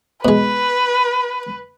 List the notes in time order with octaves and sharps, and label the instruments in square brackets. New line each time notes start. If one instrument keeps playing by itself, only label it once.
[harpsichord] B2 G#3 [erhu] B4